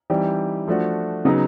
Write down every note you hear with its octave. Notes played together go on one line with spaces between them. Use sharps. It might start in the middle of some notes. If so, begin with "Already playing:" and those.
E3 G3 C4 D#4 G4
F3 A3 D4 F#4
C#3 F#3 B3 D#4